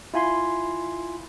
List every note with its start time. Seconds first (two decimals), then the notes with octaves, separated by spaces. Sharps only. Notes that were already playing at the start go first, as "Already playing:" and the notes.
0.14 E4 F4 G#5 B5 C6